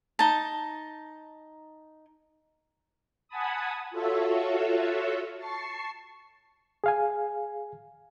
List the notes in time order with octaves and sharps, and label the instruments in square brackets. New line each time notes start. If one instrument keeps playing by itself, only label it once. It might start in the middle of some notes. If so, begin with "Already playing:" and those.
[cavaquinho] D#4 A5
[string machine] F#5 G#5 A5 B5 D#6
F4 F#4 A4 C#5 E5
A5 C#6 C7
[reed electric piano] G#4 F5 G#5